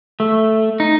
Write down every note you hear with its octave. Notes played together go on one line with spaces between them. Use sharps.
A3
D#4